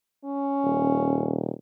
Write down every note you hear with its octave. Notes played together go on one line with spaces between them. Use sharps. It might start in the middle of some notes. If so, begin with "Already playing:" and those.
C#4
D#1